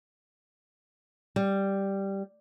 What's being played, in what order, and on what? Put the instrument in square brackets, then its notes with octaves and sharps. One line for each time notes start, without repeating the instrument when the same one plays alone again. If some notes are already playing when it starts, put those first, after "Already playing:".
[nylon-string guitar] G3